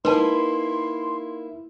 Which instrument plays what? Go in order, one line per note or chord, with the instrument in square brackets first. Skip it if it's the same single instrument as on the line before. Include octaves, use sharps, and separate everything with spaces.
[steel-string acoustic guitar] A#3 E4 [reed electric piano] D#4 [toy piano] B4 A5 [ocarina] C6